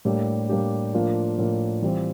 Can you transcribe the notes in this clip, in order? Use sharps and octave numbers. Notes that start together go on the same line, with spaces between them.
A2 G3 A#3 D4 G4
A2 G3 A#3 D4 G4
A2 F3 A#3 D4 F4
A2 F3 A#3 D4 F4
E3 G3 C4 F4